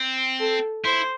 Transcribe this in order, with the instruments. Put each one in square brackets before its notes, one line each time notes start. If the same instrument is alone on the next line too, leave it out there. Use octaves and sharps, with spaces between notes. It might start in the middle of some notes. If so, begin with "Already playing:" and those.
Already playing: [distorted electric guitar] C4
[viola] A4
[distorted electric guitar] E4 [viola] C5